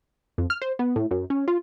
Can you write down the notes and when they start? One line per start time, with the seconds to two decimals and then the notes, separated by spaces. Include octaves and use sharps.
0.38 F2
0.50 F6
0.62 C5
0.79 B3
0.96 A2
1.11 F#2
1.30 C#4
1.48 F4